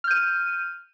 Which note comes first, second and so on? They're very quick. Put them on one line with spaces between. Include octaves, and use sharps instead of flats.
F6 G6 D#7